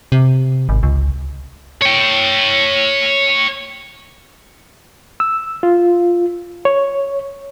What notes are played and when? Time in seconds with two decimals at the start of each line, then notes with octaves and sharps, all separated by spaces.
0.12 C3
0.69 G#1
0.83 C#2
1.82 C#5 G5
5.20 E6
5.63 F4
6.65 C#5